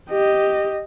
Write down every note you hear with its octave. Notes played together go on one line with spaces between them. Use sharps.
G4 D#5